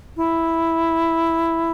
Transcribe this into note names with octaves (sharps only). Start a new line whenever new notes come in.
E4